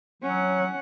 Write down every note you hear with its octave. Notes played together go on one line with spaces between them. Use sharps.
F#3 C#4 F#5